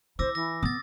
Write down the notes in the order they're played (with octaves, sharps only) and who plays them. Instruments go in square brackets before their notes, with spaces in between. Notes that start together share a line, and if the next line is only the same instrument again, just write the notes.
[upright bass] E4 [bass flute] C5 [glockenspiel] D6 E6 A#6
[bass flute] E3 [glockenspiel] A#6
[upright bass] B3 [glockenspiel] D#6 A6